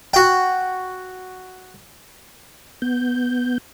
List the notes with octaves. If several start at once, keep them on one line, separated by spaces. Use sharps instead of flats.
F#4 G5
B3 G6